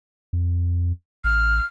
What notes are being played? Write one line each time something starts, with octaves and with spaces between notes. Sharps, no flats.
F2
A1 F6